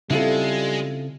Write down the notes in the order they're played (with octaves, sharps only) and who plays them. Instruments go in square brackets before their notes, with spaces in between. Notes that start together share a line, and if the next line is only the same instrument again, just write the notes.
[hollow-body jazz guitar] C#3 C4 [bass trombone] G3 [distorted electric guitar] G#3 [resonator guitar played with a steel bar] E4 F4 A4